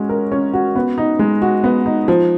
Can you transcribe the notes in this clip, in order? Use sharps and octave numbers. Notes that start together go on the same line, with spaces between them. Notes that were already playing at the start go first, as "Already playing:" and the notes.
Already playing: G#3 C#4 F#4
A#4
C#4
F#4
B3
D#4
G#3
F#4
B3
D#4
F3